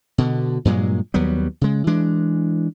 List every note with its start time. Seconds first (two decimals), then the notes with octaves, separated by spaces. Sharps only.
0.18 B2 D3
0.65 G2 A#2 F#3 G#3
1.14 D#2 F#3 G3 B3
1.61 C#3 G#3
1.87 E3 G#3 D4